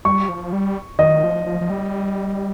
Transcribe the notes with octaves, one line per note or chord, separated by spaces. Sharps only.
G3 C#6
F3
G3
D#3 D#5
F3
F3
F3
G3